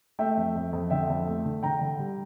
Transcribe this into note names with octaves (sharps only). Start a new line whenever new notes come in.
A3 E5 G5
F2
F2
F2
D3 E5 G5
F2
A3
D3
D3 G5 A#5
D3
G3